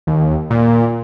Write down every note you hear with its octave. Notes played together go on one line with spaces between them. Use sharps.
D#2
A#2